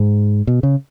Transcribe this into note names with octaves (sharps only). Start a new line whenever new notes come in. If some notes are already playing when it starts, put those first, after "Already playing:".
Already playing: G#2
B2
C#3